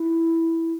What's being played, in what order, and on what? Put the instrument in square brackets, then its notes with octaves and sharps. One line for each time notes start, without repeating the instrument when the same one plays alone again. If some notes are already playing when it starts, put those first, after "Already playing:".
Already playing: [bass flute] E4